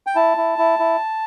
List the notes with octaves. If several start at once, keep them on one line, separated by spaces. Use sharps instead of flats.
G5
E4 A5
E4
E4
E4